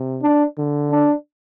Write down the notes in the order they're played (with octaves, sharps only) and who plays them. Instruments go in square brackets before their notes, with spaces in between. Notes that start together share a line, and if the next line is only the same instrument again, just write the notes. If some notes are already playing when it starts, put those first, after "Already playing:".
Already playing: [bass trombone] C3
[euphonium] D4
[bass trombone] D3
[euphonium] D4